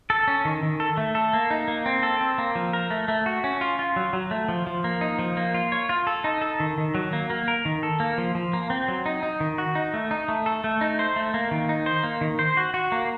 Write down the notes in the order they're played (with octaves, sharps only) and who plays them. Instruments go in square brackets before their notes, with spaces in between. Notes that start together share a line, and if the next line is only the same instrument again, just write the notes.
[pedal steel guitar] A4
C#4
D#3
D#3
A4
A3
A4
A#3
D#4
A#3
C4
A4
C4
A#3
F3
A#4
A3
A3
F#4
C#4
F4
F4
F#3
F#3
A3
F3
F3
A#3
D#4
F3
A#3
F4
C#5
F4
A4
D#4
A4
D#3
D#3
F#3
A#3
A#3
A#4
D#3
A4
A#3
F3
F3
A#3
C4
F#3
D#4
D#4
D#3
F#4
D#4
A3
D#4
A3
A4
A3
D#4
C5
A3
A#3
D#3
D#4
C5
A#3
D#3
C5
F#4
F#4
A#3